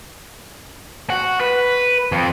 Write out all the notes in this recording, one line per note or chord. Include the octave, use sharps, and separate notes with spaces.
F#4
B4
F2